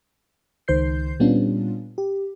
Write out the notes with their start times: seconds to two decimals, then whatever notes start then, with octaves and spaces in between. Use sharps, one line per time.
0.68 C#2 D#3 C5 G6 C7
1.20 A#2 G3 B3 C#4 D4 F4
1.98 G4